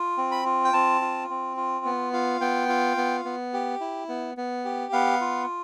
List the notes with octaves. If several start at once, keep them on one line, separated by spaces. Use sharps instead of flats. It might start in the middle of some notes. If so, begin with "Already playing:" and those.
Already playing: F4
C4
B5
F4
G5
C4 A5
F4
C4
F4
B3
F4
B3 G5
F4
B3
B3
G4
E4
B3
B3
G4
B3 F5
F4